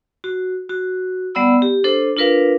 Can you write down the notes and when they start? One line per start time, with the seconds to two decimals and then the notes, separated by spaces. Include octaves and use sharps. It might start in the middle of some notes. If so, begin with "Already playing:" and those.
0.24 F#4
0.69 F#4
1.35 G3 B3 D5 F#5 B5 E6
1.62 G4
1.84 D4 A4 C5
2.16 D4 F4 A#4 B4 F5